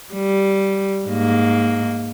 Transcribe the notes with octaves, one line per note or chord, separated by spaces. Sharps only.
G3
G#2 A#3